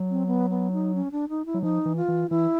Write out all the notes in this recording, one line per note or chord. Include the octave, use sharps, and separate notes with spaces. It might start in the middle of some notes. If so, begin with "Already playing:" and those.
Already playing: F#3
C4
B3
B3
D#4
C#4
D4
D#4
E4
F#3
F3 D#4
E3
F4
E3
E3 E4